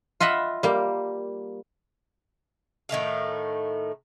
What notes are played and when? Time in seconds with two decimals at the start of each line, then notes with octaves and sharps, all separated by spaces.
0.20 F4 D#5 E5 F#5 B5
0.63 G3 A#3
2.89 A2 D#3 A3 F5